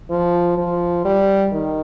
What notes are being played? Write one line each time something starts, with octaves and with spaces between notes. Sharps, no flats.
F3
F3
G3
D#3